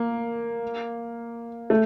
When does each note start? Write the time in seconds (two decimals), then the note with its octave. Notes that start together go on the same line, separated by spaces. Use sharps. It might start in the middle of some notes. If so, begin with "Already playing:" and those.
Already playing: A#3
1.70 A3